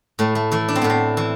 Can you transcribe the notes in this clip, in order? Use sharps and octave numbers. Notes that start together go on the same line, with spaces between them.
A2 A3
A3
E3 A3
D4
C4
A2 B3
C4
E3